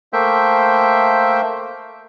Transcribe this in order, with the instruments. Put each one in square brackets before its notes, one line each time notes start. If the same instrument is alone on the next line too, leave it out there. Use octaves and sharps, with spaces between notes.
[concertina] A3 A#3 C5 E5 G5